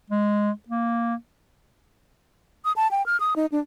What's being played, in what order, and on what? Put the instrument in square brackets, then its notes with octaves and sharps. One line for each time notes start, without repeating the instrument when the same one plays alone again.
[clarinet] G#3
A#3
[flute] D#6
A5
G5
F6
D#6
D#4
D4